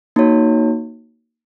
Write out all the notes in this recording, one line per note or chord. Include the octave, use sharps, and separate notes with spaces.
A#3 D#4 F#4 C#5